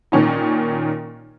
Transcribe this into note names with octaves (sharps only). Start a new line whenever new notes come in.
A#2 D#3 C#4 D#4